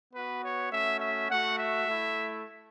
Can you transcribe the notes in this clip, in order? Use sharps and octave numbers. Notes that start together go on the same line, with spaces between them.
B3 F#4 B4
C#5
A3 C#4 F#4 E5
E5
A3 F#4 F#5
E5
A3 E4